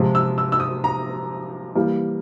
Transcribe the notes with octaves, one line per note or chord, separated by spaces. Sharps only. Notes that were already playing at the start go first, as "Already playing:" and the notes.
Already playing: C3 F3 G#3
E6
E6
E6
D#6
A#5
E3 G3 A#3